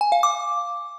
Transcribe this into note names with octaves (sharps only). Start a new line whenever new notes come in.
G#5
F5
D6